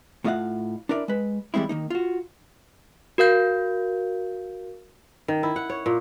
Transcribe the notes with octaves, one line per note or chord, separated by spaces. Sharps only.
A2 A3 F4 D#5 F5 F#5
D4 E4 A#4 D5
G#3 B4
E3 G3 G#3 C4 E4
D#3 A#3 D#4
F4 F#4
F#4 A#4 F5 G6
D#3
E4
F#5
C#5
A#2